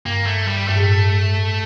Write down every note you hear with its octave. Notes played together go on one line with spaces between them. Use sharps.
G2 A#3
A3
G3
G2 A3
A2
G2